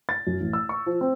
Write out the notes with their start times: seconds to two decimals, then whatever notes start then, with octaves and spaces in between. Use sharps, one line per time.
0.09 A6
0.27 F#2
0.40 A1
0.53 E6
0.69 C#6
0.86 F3
1.01 C4